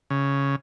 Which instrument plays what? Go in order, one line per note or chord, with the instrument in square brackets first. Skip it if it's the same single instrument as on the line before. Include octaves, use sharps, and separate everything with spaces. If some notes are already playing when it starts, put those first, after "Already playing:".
[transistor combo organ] C#3